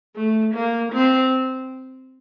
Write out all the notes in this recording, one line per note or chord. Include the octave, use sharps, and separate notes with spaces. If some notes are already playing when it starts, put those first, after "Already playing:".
A3
A#3
C4